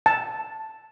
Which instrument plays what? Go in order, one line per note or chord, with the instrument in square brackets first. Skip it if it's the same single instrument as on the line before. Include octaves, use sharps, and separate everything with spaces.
[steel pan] A5